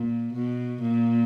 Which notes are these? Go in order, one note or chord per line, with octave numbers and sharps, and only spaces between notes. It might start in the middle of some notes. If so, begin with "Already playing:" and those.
Already playing: A#2
B2
A#2